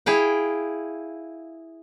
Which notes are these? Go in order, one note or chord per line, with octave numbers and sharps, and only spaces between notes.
E4 G#4 F5 G5